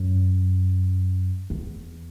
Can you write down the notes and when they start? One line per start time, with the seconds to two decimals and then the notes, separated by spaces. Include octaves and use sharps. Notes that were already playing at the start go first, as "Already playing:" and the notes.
Already playing: F#2
1.50 E2